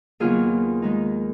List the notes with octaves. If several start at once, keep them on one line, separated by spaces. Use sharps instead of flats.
D#2 C#3 F#3 B3 F4 G#4
D#3 G#3 D#4